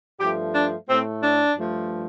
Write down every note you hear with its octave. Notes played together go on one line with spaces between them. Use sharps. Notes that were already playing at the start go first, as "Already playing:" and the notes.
G2 F3 A3 G4
D4
A2 A3 C4
D4
G2 F3 A3